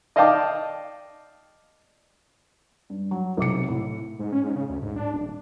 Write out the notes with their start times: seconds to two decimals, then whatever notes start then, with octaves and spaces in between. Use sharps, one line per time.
0.16 D5 D#5 F5 G5 A5 D6
2.90 G2
3.11 F#3
3.37 B1 C3 D6 C#7
3.68 A2
4.19 G#2
4.32 C#4
4.44 G#2
4.55 C#3
4.69 D2
4.82 G#2
4.96 D4
5.14 D#1